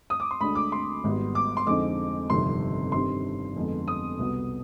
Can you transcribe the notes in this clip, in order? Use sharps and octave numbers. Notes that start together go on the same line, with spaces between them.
D#6
D6
C6
D2 D3 G#3 D4 B5
D6
C6
G#1 G#2 G3 B3
D6
C6
F2 D3 G#3 C4 D#4 D6
G1 F2 C3 D#3 G3 C6
G2 D#3 G3 C4 C6
F2 D3 G#3 B3
D#6
C2 B2 B3